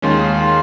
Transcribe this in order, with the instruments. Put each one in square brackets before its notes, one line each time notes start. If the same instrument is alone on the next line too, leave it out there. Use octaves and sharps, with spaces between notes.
[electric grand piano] D#2 D#3 G#3 C#4 [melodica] F4